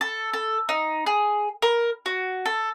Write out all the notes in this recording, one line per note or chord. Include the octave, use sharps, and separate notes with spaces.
A4
A4
D#4
G#4
A#4
F#4
A4